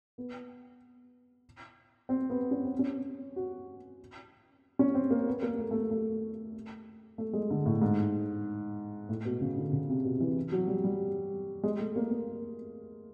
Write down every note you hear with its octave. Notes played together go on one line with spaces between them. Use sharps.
B3
C4
B3
C#4
C4
C#4
F#4
C#4
C4
A#3
B3
A#3
A3
A3
A#3
A3
A3
G#3
D3
A2
G#2
A2
B2
C#3
D3
C#3
C3
B2
E3
F#3
G3
G3
G#3
A3
A#3
A#3